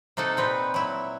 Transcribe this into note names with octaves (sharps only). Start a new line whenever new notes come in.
C3 A#3 D#4 A4 F#5
A#2 C4 B4
F#3 E4